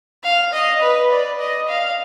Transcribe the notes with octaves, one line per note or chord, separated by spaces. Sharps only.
F5
D#5
B4
D5
D#5
F5